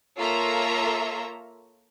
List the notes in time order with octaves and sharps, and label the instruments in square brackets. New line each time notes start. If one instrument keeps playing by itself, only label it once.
[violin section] A#3 F4 A4 C#5 E5 A#5